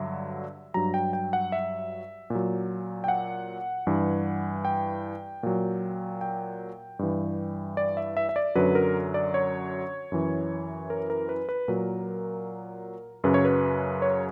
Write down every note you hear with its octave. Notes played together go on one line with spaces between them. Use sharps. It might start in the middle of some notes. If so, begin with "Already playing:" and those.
Already playing: G2 D3 F#3 E5
G2 F#3 A#5
G5
G5
F#5
E5
A#2 F#3
G5
F#5
G2 E3
G5
A#2 F#3
G5
G2 E3
D5
E5
E5
E5
D5
F#2 D3 F#3 B4
A#4
D5
C#5
F#2 E3
A#4
A#4
B4
B4
A#2 F#3 A#4
F#2 C#3 F#3 B4
C#5
B4
C#5